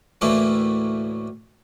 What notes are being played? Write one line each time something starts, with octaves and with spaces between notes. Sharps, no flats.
D2 A2 E3 A3 A#3